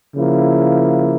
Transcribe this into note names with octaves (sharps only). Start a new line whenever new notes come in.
C#3 F3 A#3 E4